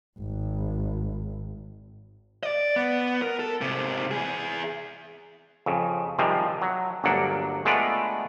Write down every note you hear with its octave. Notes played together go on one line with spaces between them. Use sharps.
G#1
D5 D#5
B3
A#4
A4
G#2 C3
E3 G#4
F2 C#3
C3 D#3 F3 G3 G#3 C4
F#3
G1 D2 F#3 A#3 D4 F#5
G#3 A3 B3 D4 F4 D5